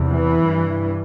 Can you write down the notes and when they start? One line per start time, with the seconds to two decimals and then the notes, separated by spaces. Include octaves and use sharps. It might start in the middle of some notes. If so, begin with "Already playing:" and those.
Already playing: E2 C3
0.09 E3
0.47 G2